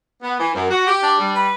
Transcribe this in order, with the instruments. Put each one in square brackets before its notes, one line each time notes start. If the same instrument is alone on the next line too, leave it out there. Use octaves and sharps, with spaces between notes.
[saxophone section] B3
E3
F#2
F#4
G4
D4
G3
B4